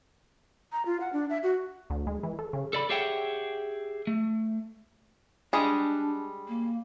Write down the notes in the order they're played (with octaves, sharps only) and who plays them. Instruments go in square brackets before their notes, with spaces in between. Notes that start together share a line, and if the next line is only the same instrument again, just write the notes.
[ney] A#5
F4
F#5
D4
E5
F#4
[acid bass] D2
G#3
E3
A4
C#3
[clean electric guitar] A4 D5 B5
G4 G#4 C#5 E5 F#5 G5
A3
[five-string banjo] G3 G#3 G#4 [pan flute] D4
[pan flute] A#3